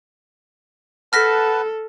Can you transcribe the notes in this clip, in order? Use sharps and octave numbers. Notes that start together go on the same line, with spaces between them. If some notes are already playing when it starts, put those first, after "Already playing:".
A4 B4 F#5 A5 F6 A#6 B6